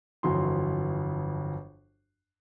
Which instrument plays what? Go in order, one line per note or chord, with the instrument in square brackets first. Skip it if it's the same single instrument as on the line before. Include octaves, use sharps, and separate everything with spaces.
[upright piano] G1 F2 E3 F#3 F#4 C6